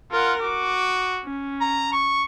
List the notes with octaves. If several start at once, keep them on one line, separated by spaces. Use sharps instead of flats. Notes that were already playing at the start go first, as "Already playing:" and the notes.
F4 A#4 F#5
F#4 D6
C#4
A#5
C#6